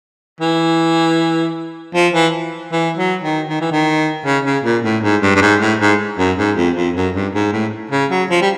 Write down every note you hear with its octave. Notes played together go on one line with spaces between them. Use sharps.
E3
F3
E3
E3
F#3
D#3
D#3
E3
D#3
C#3
C#3
A#2
A2
G#2
G2
G2
G#2
A2
G#2
F#2
G#2
F2
F2
F#2
G2
G#2
A2
C#3
F#3
F3
G3